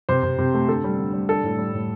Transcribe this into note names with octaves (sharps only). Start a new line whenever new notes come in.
C3 C5
C3
C3
A3
D3 A4
G3
D3
G3
D4 A4
A2
G3
A2